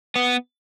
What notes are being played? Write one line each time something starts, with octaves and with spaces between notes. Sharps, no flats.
B3